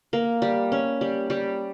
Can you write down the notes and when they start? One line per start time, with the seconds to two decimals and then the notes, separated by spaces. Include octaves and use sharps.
0.13 A#3
0.42 G3
0.72 C#4
1.01 G3
1.30 G3